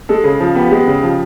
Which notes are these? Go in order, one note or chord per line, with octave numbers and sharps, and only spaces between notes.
G#3 A4
C#3 G#4
F3
B3 G4
G#3
C#3
F3